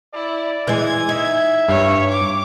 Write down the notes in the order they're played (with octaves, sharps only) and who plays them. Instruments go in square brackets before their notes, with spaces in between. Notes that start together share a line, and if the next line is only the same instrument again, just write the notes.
[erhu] E4 [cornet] D5
[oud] E3 G#3 [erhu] G#6
[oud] D#4 [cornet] E5
[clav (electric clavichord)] G2 [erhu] C#5
[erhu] D6